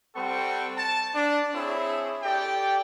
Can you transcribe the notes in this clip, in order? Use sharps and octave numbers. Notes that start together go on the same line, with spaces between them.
G3 C4 A4 F#5 C#6
A5
D4
C4 E4 G#4 C#5 E5
G4 A4 D5 G5